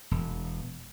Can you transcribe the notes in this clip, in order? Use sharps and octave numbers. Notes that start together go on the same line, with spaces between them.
E1